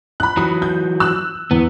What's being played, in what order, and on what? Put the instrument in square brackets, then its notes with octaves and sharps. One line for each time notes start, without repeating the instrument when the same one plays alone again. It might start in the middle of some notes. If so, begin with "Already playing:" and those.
[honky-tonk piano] B5 F#6
[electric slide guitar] E3 F#3 [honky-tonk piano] B5 D#6
[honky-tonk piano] G6
E6 F#6
[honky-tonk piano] E2 [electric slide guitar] B3